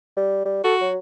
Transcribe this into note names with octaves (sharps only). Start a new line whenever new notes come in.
G3
G3
F#4 A4
F#3